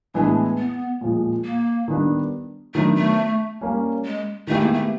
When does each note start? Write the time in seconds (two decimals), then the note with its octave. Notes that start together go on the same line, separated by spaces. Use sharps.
0.14 A2 E3 G#3 B3 D4
0.58 B3
1.01 A#2 F3 G#3
1.44 A#3
1.88 D#3 G3 B3 D4
2.74 D#3 F#3 A3 B3 D4
2.97 A3
3.61 G3 A#3 C#4
4.05 G#3
4.47 D#3 G#3 A3 B3 E4 G4
4.60 A#3
4.73 A3